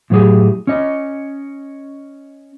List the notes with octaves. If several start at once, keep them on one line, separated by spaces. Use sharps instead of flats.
A2 F#3 G4 G#4
C#4 D#5